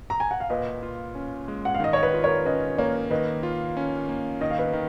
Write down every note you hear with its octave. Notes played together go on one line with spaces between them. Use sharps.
A#5
G#5
F#5
F5
A#2 B4 D#5
F4
C#4
G#3
F#5
F5
D#3 D#5
C#5
B4
F4
A#4 C#5
C#4 B4 D#5
A#3 A#4 C#5
D#3 B4 D#5
F4
C#4
A#3
D#3 D#5
F5
B4 D#5
D#3